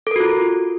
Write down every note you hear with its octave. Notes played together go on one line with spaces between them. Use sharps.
F4 F#4 A4 A#4